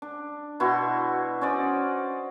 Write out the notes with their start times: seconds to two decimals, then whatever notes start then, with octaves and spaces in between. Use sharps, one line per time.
0.02 D4
0.60 B2 E4 F#4 C6
1.41 C#4 C5 D5 D#5